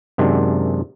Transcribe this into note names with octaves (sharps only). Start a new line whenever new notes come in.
F#2 C3 D#3 G#3 D4